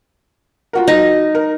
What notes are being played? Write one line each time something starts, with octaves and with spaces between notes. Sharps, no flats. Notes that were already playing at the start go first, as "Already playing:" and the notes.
F4 F#4 A#4
F#3 D#4 A#6
A#4